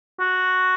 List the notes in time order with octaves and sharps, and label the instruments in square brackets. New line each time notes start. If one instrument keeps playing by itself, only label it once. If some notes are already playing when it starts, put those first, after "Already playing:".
[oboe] F#4